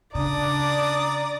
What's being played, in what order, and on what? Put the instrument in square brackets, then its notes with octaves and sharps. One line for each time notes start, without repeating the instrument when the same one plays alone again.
[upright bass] C#3 [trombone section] D4 [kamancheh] D5 [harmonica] A#5 D#6